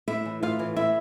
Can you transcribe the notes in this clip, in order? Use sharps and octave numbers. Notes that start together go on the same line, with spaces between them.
A2 E4 E5
E3
A2 F4 F5
E3
A2 E4 E5